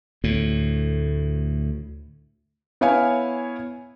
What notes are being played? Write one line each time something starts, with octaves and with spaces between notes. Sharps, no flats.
D2 A2
B3 E4 C#5 F5 G#5